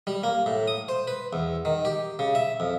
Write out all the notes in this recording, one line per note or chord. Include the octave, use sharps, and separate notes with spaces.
G3
A#3
A2
D#6
C5
B4
E2
D#3
G4
C#3
E5
F2